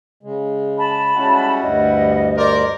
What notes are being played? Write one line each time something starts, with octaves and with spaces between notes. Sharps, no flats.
C#3 G#3
A5 B5
G3 G#3 C#4 E4 F#4 F#5
D2 G2 D#5
A#4 C5 D5